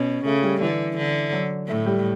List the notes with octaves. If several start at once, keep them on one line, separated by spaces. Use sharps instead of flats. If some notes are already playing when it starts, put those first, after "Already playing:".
Already playing: B2 C#4
C#3 A3
G3
D3 E3
D3
F#3
A2 A3
G3